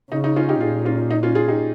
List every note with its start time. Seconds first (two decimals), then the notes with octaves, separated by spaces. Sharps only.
0.11 C#3 D#4
0.24 D#4
0.36 C#4 F4
0.49 D#4 G4
0.61 A#2 F4 G#4
0.85 C#4 F4
1.11 D#4
1.23 C#4 F4
1.35 F4 G#4
1.48 D#4 G4